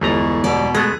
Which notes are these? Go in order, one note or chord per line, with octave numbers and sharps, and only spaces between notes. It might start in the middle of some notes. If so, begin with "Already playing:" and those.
G1 E2 A2 G#3 A3 A#5
B2 D5
G#3 A3 B3 G#4